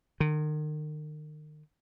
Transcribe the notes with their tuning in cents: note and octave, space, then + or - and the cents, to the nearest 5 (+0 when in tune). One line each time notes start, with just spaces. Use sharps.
D#3 -40